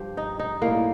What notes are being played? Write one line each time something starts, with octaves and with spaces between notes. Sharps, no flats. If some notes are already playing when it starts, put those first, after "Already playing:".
Already playing: G2 F3 G4
D#4
D#4
A2 G3 A#3